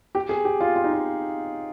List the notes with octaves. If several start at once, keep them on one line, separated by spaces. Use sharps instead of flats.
G4
G#4
G4
F4
F4
D#4
F4